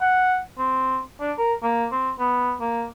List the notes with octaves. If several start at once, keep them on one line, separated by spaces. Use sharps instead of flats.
F#5
C4
D4
A#4
A#3
C4
B3
A#3